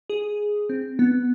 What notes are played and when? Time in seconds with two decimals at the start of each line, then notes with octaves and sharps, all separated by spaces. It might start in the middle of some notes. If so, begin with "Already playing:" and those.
0.10 G#4
0.69 C4
0.99 B3